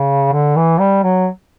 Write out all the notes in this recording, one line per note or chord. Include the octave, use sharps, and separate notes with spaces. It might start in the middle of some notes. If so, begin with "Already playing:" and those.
Already playing: C#3
D3
E3
G3
F#3